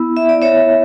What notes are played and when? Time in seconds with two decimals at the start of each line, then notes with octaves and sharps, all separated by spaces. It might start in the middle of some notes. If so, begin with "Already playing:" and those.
Already playing: B3 E4
0.17 E5
0.29 D5
0.42 C#5 E5